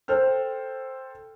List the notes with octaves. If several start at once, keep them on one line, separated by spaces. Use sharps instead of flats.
A4 C5 G5 F6